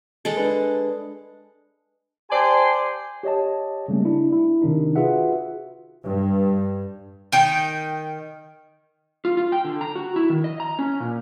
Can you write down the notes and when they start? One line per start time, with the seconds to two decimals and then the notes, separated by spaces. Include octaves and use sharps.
0.25 G#3 A4
0.37 D4 B4
2.31 G4 C5 D5 G#5 A5 C6
3.23 G4 C#5 D#5 A5
3.88 C#3 G3 A3 A#3 C#4
4.05 D4 E4
4.33 E4
4.62 C3 D#3 D4 D#4
4.96 F4 F#4 G#4 B4 E5 F#5
6.05 G2
7.32 D#3 G5
9.25 F4
9.37 F4
9.52 G5
9.65 D3
9.81 A#5
9.96 F#4
10.16 E4
10.30 D#3
10.44 D#5
10.60 A#5
10.79 C#4
11.00 A#2